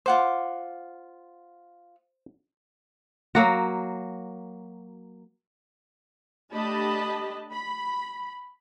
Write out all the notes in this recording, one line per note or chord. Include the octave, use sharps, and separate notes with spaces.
F4 C5 F#5 D6
F#3 A#3 F#4
A3 D4 G4 D#5 A5 B5
B5